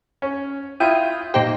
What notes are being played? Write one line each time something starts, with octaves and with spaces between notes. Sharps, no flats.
C#4
E4 F4 G5 D#6
A#2 D#4 G4 C5